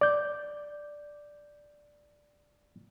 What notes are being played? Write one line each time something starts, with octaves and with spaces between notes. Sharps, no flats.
D5 G6